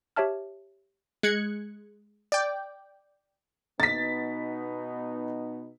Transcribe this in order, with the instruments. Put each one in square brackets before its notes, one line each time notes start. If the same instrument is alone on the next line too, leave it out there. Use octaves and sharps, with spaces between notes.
[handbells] G4 C#5 E5 A5 F6
[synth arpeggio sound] G#3 F#6 G#6 C#7
D5 G5
[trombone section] B2 B3 D#4 [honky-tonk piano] A6 B6